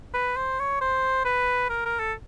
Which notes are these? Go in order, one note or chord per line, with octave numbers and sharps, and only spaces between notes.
B4
C5
C#5
C5
B4
A#4
A#4
A4